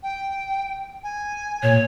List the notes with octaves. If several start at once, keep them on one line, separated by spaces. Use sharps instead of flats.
G5
G#5
A#2 C#5